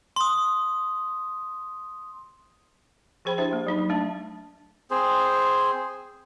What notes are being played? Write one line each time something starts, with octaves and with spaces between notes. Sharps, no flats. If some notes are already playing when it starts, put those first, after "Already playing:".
C6 D#6
F3 G#4 C5 G5 B5
D4 E4 G4 C5 E5
A#3
F#3 D#4 B5
F#3
A3 D4 E5 A5
C4 G#4 C5